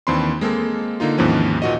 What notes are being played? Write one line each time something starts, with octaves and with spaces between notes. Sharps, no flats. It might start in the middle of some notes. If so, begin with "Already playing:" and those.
D#2 E3 C4 D4 B5 C6
G#3 A#3 C4 A4
D3 A#3 D#4 F4
D#2 G#2 E3 F3 C4 C#4
A#2 F#4 D#5